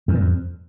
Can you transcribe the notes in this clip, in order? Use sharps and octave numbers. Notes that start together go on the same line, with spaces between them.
E2
A#2
F2